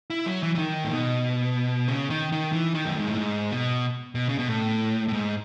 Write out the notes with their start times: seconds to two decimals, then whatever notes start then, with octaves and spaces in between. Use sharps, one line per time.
0.10 E4
0.26 F#3
0.43 E3
0.55 E3
0.58 D#3
0.84 A2
0.91 B2
1.88 C#3
2.10 D#3
2.32 D#3
2.53 E3
2.74 D#3
2.85 F#2
2.97 G#2
3.07 A2
3.18 G#2
3.51 B2
4.15 B2
4.29 C#3
4.39 B2
4.47 A2
5.08 A2
5.13 G#2